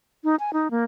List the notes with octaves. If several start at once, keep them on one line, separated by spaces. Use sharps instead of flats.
D#4
G#5
D#4
A#3